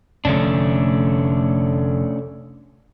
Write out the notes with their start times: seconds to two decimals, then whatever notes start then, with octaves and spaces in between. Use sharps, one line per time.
0.25 F1 D3 A3 C#4 D4